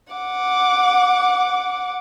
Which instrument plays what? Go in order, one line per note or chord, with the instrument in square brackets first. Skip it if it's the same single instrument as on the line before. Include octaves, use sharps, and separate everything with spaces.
[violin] F#5 D6